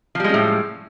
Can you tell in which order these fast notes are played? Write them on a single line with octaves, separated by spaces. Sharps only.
F3 G3 G#3 C#4 A2